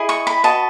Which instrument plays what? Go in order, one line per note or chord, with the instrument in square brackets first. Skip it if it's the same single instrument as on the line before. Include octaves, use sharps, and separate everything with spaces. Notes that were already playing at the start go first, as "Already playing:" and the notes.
Already playing: [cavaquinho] E4 G#4 D#5
C#6
B5
F#4 B4 D#5 A5